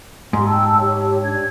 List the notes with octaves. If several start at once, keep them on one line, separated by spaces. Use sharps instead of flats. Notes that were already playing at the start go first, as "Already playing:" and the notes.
G#2 G4 C6
G5 A5 E6
G4 C#5
D4 G#6